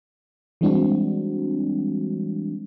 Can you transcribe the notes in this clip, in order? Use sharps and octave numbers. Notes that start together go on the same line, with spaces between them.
E3 G3 G#3 C4 D4 F#4